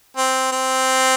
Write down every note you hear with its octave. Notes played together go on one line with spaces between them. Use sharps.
C4
C4